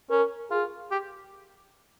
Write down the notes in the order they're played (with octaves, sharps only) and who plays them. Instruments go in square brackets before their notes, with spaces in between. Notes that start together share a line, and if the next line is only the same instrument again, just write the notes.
[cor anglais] C#4 [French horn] A#4
[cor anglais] F4 [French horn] G#4
[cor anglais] G4